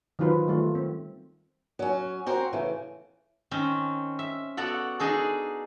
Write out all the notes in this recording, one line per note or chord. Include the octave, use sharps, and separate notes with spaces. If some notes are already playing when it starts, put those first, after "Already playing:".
D#3 F#3 D#4 F4 B4 C5
D#3 G3 A3 F4
C4
F#3 C#4
C4 F#4 A#4 C5
C#3 E3 A3
D#3 C4 C#4
E5
B3 F#4 A4 D5 F#5
D4 D#4 G#4 A4